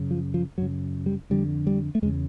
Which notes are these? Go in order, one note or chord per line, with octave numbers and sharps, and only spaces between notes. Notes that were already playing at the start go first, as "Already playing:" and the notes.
Already playing: F#2 C#3
F3
F3
F#2 C#3 F#3
G3
F2 D3 G3
G3
A3
E2 C#3 G#3